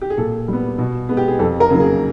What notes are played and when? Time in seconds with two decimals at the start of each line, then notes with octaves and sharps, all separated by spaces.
0.02 G4
0.10 G#4
0.17 A#2 A4
0.48 G3 B3
0.78 B2
1.09 G#3 B3
1.17 G4
1.28 G#4
1.39 F2 A4
1.60 A#4
1.70 C#3 F#3 A#3
1.80 G#4